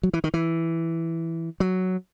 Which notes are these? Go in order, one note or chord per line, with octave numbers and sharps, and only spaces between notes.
F#3
E3
D#3
E3
F#3